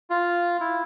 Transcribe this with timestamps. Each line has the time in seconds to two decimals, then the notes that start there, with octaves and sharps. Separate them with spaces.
0.10 F4
0.61 E4